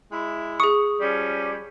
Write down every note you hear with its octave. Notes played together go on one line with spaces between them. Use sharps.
G#3 E4
G#4 C#6 D#6
F3 G3 C#4